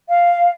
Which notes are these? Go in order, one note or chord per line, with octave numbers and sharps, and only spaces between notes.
F5